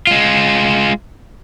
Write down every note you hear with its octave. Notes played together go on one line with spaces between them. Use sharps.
G#3 F4